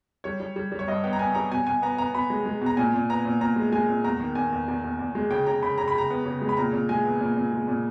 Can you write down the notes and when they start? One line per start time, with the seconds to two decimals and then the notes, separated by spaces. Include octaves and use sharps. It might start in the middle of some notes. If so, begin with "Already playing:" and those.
0.24 G3 C#5
0.40 G3
0.56 G3
0.72 G3
0.79 C#5
0.88 G2 D#5
1.04 B3 G5
1.13 A#5
1.19 B3 G#5
1.35 G3 A#5
1.51 B2 G#5
1.67 B2 G#5
1.82 B3 A#5
1.98 B3 A#5
2.14 B2 B5
2.30 G#3
2.46 G#3
2.61 B2 A#5
2.77 A#2 G#5
2.94 A#2
3.09 B3 A#5
3.25 A#2
3.41 A#2 A#5
3.56 G#3
3.72 G#3 G#5
3.89 A#2
4.04 E2 A#5
4.20 D#3
4.35 E2 G#5
4.52 E2
4.68 E2
4.84 E2
4.99 E2
5.15 G#3
5.31 C#3 G5
5.47 C#3 A#5
5.62 C#3 B5
5.78 C#3 A#5
5.88 B5
5.95 C#3 A#5
6.10 B3
6.26 C#3
6.42 G#3
6.49 B5
6.57 A#2 A#5
6.73 A#2
6.89 G#3 G#5
7.05 B3
7.21 A#2
7.37 A#2
7.52 G#3
7.68 A#2